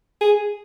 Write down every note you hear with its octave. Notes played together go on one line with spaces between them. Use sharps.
G#4